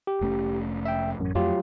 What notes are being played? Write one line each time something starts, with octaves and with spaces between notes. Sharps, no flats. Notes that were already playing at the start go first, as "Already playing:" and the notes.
G4
F1 A3 C#4
E5 G5
A1 F#2
F2 F#3 A3 F4 G4